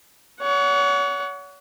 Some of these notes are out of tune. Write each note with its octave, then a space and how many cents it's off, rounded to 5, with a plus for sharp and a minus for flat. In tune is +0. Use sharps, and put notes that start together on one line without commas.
C#5 +40 F#5 +0